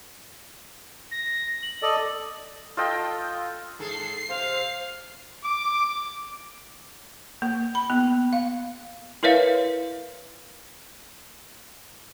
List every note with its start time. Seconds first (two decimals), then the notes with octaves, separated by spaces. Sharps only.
1.11 A#6
1.63 F#7
1.82 A4 D5 D#5
2.77 F4 A4 D#5 G5
3.79 G#2 G#4 A4 C7
4.29 C3 C4 C5 F5
5.44 D6
7.42 A#3
7.75 B5
7.90 B3
8.33 F5
9.23 E4 A#4 B4 C#5 E5 F5